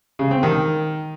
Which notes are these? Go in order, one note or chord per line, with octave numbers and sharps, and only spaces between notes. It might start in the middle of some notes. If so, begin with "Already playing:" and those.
C#3
C4
D#3